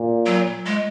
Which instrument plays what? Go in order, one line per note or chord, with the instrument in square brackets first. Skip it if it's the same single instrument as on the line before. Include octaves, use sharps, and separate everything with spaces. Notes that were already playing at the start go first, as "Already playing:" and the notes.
Already playing: [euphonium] A#2
[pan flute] F#3
G#3